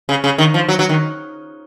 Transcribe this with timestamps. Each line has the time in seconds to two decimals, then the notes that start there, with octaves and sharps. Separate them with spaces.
0.09 C#3
0.24 C#3
0.38 D#3
0.54 F3
0.69 F#3
0.79 F#3
0.89 D#3